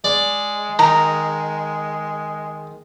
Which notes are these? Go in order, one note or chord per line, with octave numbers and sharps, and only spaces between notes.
G#3 D5
D#3 A#5